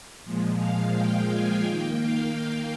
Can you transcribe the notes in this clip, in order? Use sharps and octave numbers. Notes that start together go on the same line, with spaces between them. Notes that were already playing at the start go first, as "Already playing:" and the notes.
A#2 F3 G#3
F5
G5
G#5
D#3 A#3 G5
F5